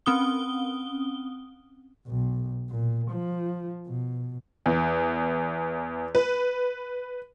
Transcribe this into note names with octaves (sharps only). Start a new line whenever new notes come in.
C4 C#4 D#6 G7
B1
A#2
F3
B2
E2
B4